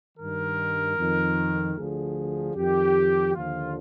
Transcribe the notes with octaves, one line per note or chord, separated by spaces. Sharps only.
G2 D#3 A#4
F2 D#3
D2 D3 F3 G#4
F2 D#3 G4
D#2 D3 F3 F4